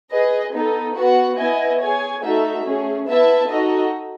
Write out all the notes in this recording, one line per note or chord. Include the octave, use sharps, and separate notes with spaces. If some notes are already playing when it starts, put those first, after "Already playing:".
G#4 B4 D#5
B3 D#4 A4
B3 F#4 B4 F#5
B3 E4 B4 D#5 G#5
G#4 C#5 G#5
A3 D#4 F#4 A4 E5
A3 C#4 G#4
B3 E4 B4 E5 A5
D#4 F#4 A4 D#5